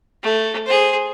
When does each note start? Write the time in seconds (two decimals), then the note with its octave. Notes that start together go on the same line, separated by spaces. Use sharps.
0.23 A3
0.66 G#4 C5